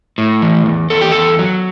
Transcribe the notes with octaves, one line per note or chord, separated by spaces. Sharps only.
A2
E3
E2
E2 A4
G4
E2 A4
F#3